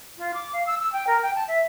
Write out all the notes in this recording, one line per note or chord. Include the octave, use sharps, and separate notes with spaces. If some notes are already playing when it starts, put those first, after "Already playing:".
F4
D6
F5
E6
E6
G5
A#4
G5
A5
E5